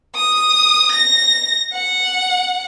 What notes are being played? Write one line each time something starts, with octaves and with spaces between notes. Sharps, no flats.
D#6
A#6
F#5